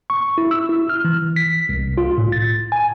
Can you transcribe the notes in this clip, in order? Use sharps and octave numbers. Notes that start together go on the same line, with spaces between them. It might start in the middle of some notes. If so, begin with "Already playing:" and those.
C#6
E4
E6
E4
F6
E3
B6
C2
F4
A2
A6
G#5